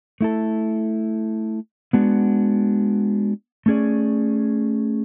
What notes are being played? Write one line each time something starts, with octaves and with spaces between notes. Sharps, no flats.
A3 E4 A4
G#3 B3 D4 F#4
A3 C#4 G#4 D5